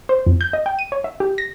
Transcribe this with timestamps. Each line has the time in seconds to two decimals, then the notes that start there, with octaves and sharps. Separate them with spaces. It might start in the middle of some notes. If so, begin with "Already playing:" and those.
0.09 C5
0.26 F2
0.41 G6
0.53 D#5
0.66 G5
0.79 D#7
0.92 C#5
1.04 E5
1.20 G4
1.38 A#6